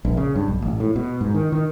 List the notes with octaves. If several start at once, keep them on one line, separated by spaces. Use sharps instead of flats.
A#1
C#3
G2
B1
A1
A2
B2
G#2
D#3
D#3